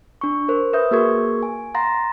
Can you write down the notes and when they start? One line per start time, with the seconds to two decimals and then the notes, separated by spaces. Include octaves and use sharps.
0.21 D4 C#6
0.49 A#4 C5
0.73 B4 E5 D#6 G6
0.91 A#3 F#4 G#4 A#4 C#6 G#6
1.43 G#5
1.74 F5 F#5 A#5 C6 A6 A#6